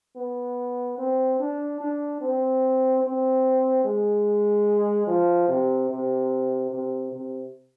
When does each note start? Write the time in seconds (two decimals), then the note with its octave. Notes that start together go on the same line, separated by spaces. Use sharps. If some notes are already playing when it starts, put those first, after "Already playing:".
0.16 B3
0.98 C4
1.40 D4
1.81 D4
2.21 C4
3.03 C4
3.85 G#3
5.07 F3
5.48 C3
5.90 C3
6.71 C3
7.12 C3